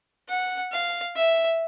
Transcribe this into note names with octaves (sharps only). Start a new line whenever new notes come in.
F#5
F5
E5